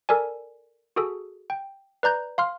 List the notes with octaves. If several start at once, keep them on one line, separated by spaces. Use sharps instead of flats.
A4 A#4 D5 G#5
F#4 G#4 A4
G5
B4 D5 A#5 G6
F5 C6 F6